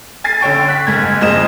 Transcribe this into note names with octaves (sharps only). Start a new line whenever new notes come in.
G#5 A6 C7
D3 C#4 G5 C#6
F#6 B6
F#1 G#2 G#6
F#1 F2 G#3 C5 D#5 E7